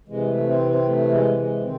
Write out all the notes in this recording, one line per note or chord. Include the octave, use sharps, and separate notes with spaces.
C3 E3 G#3
A3
C4
C4
A3
G#3
G#3
C3 D#3 C4